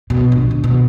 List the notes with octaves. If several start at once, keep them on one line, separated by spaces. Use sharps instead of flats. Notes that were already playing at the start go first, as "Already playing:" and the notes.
B2
A#1
D3
B2